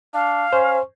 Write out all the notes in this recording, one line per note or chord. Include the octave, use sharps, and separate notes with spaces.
D4 F5
C#4 C5